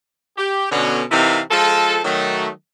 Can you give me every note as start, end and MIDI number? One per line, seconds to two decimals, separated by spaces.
0.37 0.67 67
0.71 1.03 47
0.71 1.03 50
0.71 1.03 61
1.11 1.40 48
1.11 1.40 52
1.11 1.40 63
1.11 1.40 64
1.11 1.40 70
1.11 1.40 77
1.51 1.99 53
1.51 1.99 56
1.51 1.99 65
1.51 1.99 69
2.04 2.49 51
2.04 2.49 54
2.04 2.49 57